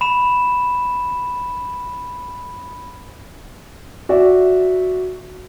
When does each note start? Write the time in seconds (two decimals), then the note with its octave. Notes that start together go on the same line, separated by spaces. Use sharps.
0.01 B5 E7
4.09 F#4 D5 E5